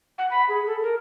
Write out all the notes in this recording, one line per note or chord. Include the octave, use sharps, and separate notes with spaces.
F#5
B5
G#4
A4
A#4